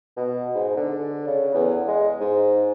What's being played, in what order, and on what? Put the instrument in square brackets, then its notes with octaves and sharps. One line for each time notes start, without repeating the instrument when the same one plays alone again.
[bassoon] B2
G#2
D3
C#3
E2
G#3
G#2